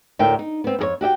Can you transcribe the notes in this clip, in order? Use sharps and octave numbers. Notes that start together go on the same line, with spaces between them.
D2 A2 A#4 E5 G5
D#4
B3 C4
F2 G#4 C#5
F#4 G4 E5 G5